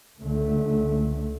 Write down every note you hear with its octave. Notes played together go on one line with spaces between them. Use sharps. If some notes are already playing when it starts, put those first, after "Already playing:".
C#2 D3 A3